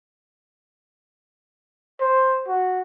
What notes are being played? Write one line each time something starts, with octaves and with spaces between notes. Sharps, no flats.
C5
F#4